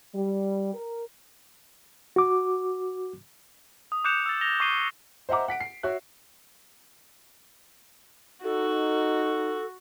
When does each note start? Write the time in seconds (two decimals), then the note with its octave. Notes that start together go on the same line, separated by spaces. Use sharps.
0.14 G3
0.74 A#4
2.16 F#4 D6
3.92 D#6
4.04 D6 F#6 G6 C#7 E7 F7
4.26 E6 A6
4.41 A#6 F7 G7
4.60 C#6 D6 C7 D#7 G7
5.29 C5 D#5 E5 F#5 A#5 D6
5.48 F#5 B6 D7
5.60 C7
5.83 F#4 C#5 E5 F#6
8.44 D#4 F#4 A4